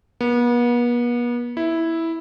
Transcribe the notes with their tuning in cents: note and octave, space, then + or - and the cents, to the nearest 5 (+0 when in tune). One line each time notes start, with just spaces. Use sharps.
B3 -40
E4 -5